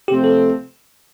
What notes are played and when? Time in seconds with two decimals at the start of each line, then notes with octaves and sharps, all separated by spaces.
0.08 C3 F3 A3 C4 G4
0.24 A4